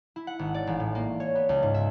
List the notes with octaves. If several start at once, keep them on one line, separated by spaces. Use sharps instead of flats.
E4
F#5
G#1
D5
A1
A2
A#3
C#5
B3
C#2
G#2
E5